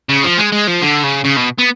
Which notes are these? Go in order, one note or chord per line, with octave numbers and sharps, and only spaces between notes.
C#3
F3
G#3
G#3
F3
D3
C#3
C#3
B2
B3